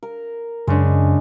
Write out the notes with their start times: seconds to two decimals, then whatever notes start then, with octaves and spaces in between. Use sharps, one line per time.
0.03 A#4
0.67 F#2 C#3 G#3 D4